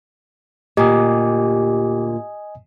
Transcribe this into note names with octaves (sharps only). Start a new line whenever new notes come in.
D2 A#2 G4 D#5 G#5 D#6